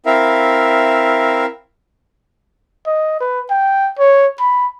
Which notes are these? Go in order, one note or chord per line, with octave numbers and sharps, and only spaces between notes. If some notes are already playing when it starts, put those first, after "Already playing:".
C4 E4 A#4 E5 F5
D#5
B4
G5
C#5
B5